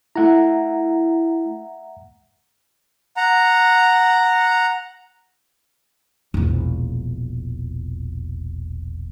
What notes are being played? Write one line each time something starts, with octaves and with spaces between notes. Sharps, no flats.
A3 E4 E5 F#5 A#5
F#5 A#5
E1 A#1